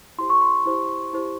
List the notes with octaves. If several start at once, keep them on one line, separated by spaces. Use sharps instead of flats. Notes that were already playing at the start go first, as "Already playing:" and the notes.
E4 G4 C5 C6
C#6
C6
E4 G4 C5
E4 G4 C5